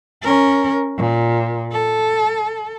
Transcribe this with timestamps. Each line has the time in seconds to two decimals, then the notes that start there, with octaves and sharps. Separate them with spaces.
0.23 C#4 A#4
0.97 A#2
1.72 A4